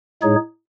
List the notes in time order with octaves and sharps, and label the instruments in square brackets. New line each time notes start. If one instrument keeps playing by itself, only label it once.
[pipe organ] A2 G#3 D#4 G#4 C#5